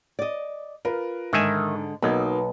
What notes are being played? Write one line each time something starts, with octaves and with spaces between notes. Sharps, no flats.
D5 D#5
F4 A#4 B4
G#2 D3 D#3 G#3 E5 G#5
B1 F#3 A#3 B3 D#4